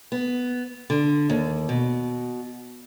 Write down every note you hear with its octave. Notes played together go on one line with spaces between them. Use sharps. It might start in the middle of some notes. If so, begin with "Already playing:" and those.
B3
D3
D#2
B2